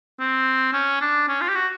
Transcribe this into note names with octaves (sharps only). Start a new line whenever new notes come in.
C4
C#4
D4
C#4
F4
G4
F#4